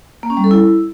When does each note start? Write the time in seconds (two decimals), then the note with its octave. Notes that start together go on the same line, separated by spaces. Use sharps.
0.23 A#3
0.30 C#4
0.37 G3
0.44 A4
0.51 E4